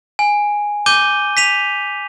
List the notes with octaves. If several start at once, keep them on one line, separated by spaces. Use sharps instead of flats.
G#5
D6 G6 D#7 G7
B6 D#7 F7